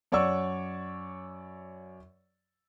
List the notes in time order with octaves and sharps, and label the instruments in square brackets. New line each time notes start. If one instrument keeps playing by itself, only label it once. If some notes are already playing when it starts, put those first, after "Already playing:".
[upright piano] F#2 C#5 D5 F#5 C#6 E6